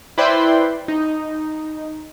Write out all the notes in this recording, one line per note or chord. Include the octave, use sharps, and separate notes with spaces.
E4 B4 C5 D5 G5 C6
D#4